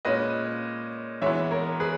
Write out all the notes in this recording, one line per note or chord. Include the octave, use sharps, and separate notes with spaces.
A#2 G#3 C#4 B4 D#5
E3 G#3 B3 C#5 E5
A#4 C#5
G#4 B4